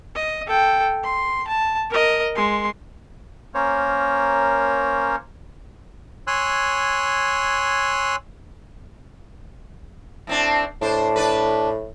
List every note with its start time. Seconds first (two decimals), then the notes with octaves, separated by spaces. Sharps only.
0.15 D#5
0.46 A4 G5
1.04 C6
1.47 A5
1.90 A#4 D#5
2.36 G#3 C6
3.54 A#3 C#4 A#4 C5 C#5
6.27 C#5 G#5 C6 E6 F#6
10.27 A2 C4 D4
10.81 A2 D4 C5
11.16 D4 B4